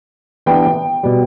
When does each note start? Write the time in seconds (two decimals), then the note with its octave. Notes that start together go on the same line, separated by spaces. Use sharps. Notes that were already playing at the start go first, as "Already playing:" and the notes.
0.46 E3 B3 D4 G4 G5
1.03 B2 G3